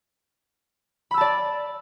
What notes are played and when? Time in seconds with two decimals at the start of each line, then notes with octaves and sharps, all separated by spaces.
1.11 B5
1.14 E6
1.18 A5
1.21 D5